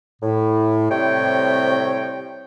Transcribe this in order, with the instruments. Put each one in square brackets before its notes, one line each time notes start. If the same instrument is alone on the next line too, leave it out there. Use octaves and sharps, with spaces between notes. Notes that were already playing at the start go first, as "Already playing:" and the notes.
[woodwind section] A2
A2 C3 G3 C4 C#5 G5